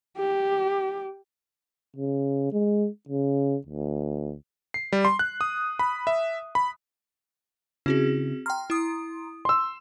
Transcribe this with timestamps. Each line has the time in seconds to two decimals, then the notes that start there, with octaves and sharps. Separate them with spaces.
0.18 G4
1.96 C#3
2.52 G#3
3.09 C#3
3.67 D2
4.74 C7
4.92 G3
5.05 C6
5.19 F#6
5.41 D#6
5.79 B5
6.07 E5
6.55 B5
7.86 C#3 C4 C#4 E4 F#4 G#4
8.46 G5 A#5 C6 F6
8.70 E4 D#6
9.45 C6 E6